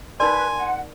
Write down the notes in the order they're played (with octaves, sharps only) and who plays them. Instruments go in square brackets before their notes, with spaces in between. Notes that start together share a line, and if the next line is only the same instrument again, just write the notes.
[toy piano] D#4 A#4 D5 [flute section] B4 [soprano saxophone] G#5 [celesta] C6
[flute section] F#5